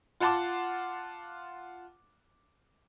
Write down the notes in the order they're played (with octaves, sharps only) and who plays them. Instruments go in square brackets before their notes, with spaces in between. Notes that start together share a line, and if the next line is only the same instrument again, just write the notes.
[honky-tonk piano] F4 F#5 A5 C6 D6